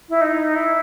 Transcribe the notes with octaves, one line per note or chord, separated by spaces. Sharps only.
E4
D#4
E4